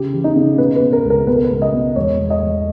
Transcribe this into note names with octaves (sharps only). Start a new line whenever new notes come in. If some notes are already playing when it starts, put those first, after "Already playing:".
Already playing: C#3 G4
E3
D#4
C#3
B2 B4
B4
B2
A#4
C#2
A#4
B2 B4
A#4
B4
C#2
D#5
B2
E1 C#5
E1
D#5
E1